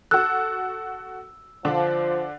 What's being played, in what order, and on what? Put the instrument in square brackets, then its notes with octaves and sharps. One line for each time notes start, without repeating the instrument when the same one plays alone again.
[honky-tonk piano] F#4 A4 [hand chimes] E6 [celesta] F#6
[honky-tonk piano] D3 D4 [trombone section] F3